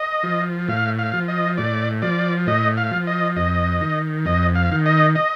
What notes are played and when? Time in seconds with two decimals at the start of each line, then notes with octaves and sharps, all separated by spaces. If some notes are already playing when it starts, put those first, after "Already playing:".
Already playing: D#5
0.23 F3
0.68 A2 F5
0.99 F5
1.13 F3
1.28 D#5
1.57 A2 D5
2.02 F3 D5
2.47 A2 D#5
2.77 F5
2.91 F3
3.07 D#5
3.36 F2 D#5
3.81 D#3
4.26 F2 D#5
4.55 F5
4.71 D#3
4.86 D#5
5.15 D#5